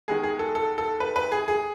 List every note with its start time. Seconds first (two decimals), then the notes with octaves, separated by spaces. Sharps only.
0.08 D#3 G#3 B3 G#4
0.23 G#4
0.39 A4
0.55 A4
0.78 A4
1.00 B4
1.16 B4
1.32 G#4
1.48 G#4